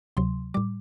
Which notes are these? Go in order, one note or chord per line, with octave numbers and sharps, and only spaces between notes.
D2 C3 F#3 C6
A2 G3 D6